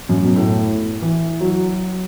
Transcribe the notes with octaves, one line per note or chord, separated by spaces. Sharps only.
F#2
B2
A2
E3
F#3